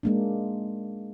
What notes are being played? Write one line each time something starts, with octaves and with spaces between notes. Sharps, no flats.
G#3 A#3 D4